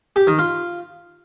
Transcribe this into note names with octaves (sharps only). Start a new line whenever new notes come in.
G4
D#3
F4